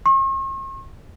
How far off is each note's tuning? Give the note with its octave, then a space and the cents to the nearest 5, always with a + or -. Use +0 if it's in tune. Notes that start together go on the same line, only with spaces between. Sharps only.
C#6 -45